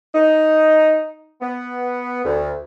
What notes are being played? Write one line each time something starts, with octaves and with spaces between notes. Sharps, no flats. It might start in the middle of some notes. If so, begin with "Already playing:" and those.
D#4
B3
D2